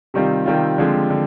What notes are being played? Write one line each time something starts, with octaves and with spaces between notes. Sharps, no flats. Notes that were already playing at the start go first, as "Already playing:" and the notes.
C3 D#3 G3 C4 F4
C3 D#3 G3 C4 F4
D3 F3 G#3 C4 G4
D3